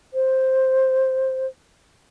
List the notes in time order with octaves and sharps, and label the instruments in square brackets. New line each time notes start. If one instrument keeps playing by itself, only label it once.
[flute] C5